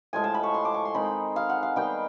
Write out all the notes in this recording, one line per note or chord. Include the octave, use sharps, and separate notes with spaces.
A2 F3 G#3 G#5
A5
B5
C#6
C6
D6
C#6
C6
D#3 G#3 C4 D#4 B5
F5
F#5
F5
D#3 G3 B3 D#4 G5